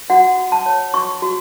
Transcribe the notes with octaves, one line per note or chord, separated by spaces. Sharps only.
F#4 F#5
F#4
A5
C#5
F#4 C#6
F#4